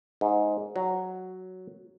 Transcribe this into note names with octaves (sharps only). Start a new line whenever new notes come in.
G#2
F#3